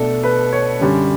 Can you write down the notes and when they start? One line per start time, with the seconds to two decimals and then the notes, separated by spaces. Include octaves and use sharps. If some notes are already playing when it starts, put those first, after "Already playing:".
Already playing: B2 A3 D4 A4
0.23 B4
0.52 C#5
0.79 F#2 D3 G3 C#4